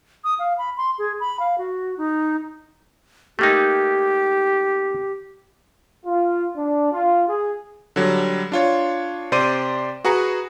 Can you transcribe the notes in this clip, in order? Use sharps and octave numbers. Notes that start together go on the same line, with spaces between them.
D#6
F5
B5
C6
G#4
B5
F5
F#4
D#4
A3 A#3 D#4 G4
F4
D4
F4
G#4
D3 F#3 G3
D4 F4 C#5
C3 C5 D5 C6 D6 D#7
F#4 G#4 B4 A#5 C#7